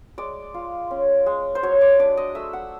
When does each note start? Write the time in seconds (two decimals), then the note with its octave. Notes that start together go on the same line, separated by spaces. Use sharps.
0.18 G#3 D5
0.54 F4
0.91 C#4
1.26 G#3
1.55 C5
1.63 F#3 C#5
1.81 D5
1.99 D4 D5
2.17 D#5
2.35 A3 E5
2.53 F#5